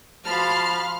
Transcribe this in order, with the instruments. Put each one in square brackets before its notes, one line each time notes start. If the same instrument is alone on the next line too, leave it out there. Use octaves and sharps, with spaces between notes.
[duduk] F3 [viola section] F#4 B5 C6 [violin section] F5 F6 [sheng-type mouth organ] A5